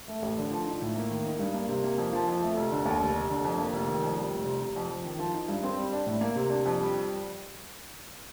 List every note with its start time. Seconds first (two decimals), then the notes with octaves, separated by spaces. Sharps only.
0.08 A3
0.22 A1
0.38 D3
0.51 F3
0.66 D#4
0.82 A2
0.96 A#3
1.10 D#3
1.25 D#4
1.39 G2
1.54 A#3
1.69 C3
1.84 A#3
1.98 F2
2.13 F3
2.28 F2
2.42 A3
2.57 F1
2.71 D3
2.86 D#2
3.00 F1
3.15 F1
3.30 D3
3.44 F2
3.58 A#3
3.73 F1
3.87 D#3
4.03 F2
4.17 G3
4.32 F1
4.46 C3
4.61 C3
4.76 F2
4.90 F2
5.04 D#3
5.19 F3
5.34 D#4
5.48 G2
5.63 C4
5.78 G3
5.93 D4
6.06 A2
6.21 A#3
6.36 C3
6.50 D4
6.66 F2
6.80 G3